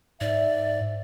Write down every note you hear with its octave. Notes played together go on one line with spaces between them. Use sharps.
G#2 D5 E5